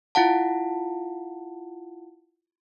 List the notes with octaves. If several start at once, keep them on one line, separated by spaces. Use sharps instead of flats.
E4 F4 F5 F#5 A5